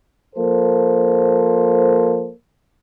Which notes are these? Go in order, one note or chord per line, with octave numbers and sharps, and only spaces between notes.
F3 A#3 A4 C5